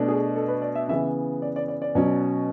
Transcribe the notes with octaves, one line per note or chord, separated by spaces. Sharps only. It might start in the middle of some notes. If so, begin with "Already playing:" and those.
Already playing: B2 A3 D4
G#4
A4
B4
D5
E5
C#3 E3 B3 E5
D5
D5
D5
D5
B2 F#3 C#4